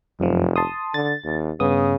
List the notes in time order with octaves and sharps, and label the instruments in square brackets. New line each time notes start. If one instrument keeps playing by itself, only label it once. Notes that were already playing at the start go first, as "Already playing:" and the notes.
[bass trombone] F1 [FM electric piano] F#2 F3
[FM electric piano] A5 C6 D#6
[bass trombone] D3 [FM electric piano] A6
[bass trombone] D#2
[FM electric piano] G2 B3 D#6 [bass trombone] C#3